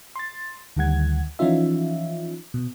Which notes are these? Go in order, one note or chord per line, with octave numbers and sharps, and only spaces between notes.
C6 A6
D2 D#3 G3 F#5 G#6
E3 F3 C#4 D#4 F4 E5
B2